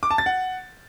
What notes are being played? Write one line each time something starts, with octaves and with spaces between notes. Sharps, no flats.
D6
A5
A6
F#5